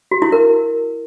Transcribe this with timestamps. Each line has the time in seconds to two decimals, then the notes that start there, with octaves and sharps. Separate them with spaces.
0.11 F#4
0.22 E4
0.32 A#4